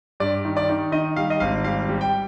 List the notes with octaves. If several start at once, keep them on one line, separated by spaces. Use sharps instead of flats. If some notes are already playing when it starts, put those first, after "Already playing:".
G2 D5
D#3
D5
D#3
D#3 D#5
G3 F5
D#5
G#1 F5
G3 F5
G3
G5